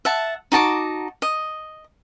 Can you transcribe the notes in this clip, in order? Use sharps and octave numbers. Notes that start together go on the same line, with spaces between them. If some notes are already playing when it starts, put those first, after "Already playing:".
E5 F#5 A5
D#4 F#4 A5 D6
D#5